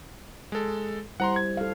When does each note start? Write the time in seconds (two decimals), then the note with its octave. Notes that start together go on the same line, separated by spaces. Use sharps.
0.52 G#3 A4
1.20 G3 E4 C5 F#5 A#5 C6
1.36 G#6
1.57 A4 F5